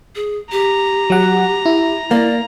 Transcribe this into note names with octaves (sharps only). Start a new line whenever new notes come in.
G#4
G4 A#5
F#3 F#5
E4
A#3 D5